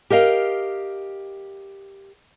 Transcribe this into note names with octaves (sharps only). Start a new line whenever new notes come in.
G4 A#4 D#5 F5